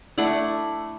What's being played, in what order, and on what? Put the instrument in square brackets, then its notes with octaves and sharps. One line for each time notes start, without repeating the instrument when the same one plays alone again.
[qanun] A3 D4 E4 F#5